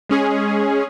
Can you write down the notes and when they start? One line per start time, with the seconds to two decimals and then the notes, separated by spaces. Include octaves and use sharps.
0.09 G#3 C#4 G#4